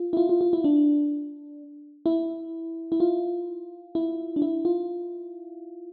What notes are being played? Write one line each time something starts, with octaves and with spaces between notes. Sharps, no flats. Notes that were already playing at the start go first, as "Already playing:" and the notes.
Already playing: F4
E4
F4
F4
F4
E4
D4
E4
E4
F4
E4
D4
E4
F4